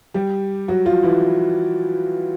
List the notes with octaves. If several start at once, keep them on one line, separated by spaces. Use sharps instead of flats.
G3 G4
F#3 F#4
F3 F4
E3 E4